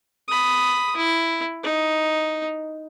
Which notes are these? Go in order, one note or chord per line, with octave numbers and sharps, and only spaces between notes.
B5 D#6
E4
D#4